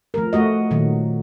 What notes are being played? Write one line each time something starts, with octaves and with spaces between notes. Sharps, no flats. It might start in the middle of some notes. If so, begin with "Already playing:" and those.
F3 A3 A#4
A3 F#4 D#5
A#2 D#3 F#3